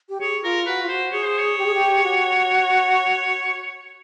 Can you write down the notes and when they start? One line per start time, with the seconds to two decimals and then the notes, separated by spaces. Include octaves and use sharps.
0.09 G4
0.21 G#4 C#5
0.44 F4 A#4
0.66 F#4 B4
0.83 F4
0.89 F#4 C5
1.12 G#4 C#5
1.25 C5
1.39 C#5
1.58 G4
1.66 G#4
1.74 G4
2.04 F#4